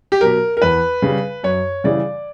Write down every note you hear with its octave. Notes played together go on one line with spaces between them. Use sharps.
G4
B2 F#3 A#4
A#4
E2 B4
C#3 G3
F#2 C#5
C#3 E3 G3 D5